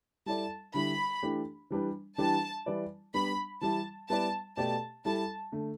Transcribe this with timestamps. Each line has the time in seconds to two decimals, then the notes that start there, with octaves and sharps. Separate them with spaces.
0.26 G3 E4 A4 D5 A5
0.74 D3 G3 E4 B5
1.23 E3 A3 D4 G4
1.70 E3 G3 D4 B4
2.18 E3 G3 D4 G4 B4 A5
2.66 E3 G3 E4 B4 D5
3.14 G3 B3 D4 B5
3.61 E3 G3 E4 A5
4.09 G3 B3 E4 B4 D5 A5
4.57 B2 A3 G4 D5 A5
5.05 G3 E4 A4 A5
5.52 D3 A3